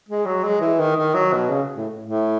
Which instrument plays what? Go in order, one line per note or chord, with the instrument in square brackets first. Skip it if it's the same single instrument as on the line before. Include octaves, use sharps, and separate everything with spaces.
[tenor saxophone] G#3
F#3
G#3
E3
D#3
D#3
F#3
B2
C#3
A2
A2